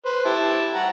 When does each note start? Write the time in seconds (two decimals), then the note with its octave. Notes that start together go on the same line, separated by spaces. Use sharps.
0.05 B4 C5
0.25 E4 G4 A5
0.75 F#5 A#5